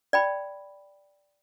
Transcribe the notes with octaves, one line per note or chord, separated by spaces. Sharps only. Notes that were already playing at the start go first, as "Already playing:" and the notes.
D5 G5 B5